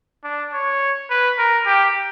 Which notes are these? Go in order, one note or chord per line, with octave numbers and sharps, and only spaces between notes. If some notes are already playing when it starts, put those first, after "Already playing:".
D4
C#5
B4
A#4
G4